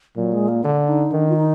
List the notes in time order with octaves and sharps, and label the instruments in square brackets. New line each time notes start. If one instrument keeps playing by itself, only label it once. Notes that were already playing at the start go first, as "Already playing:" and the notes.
[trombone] A#2 [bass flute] F#3
[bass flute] G#3
A#3
[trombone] D3 [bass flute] D4
[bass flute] D#4
[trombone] D#3 [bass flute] D4
[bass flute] F4
D#4